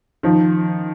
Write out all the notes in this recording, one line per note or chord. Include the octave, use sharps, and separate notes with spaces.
D#3 F3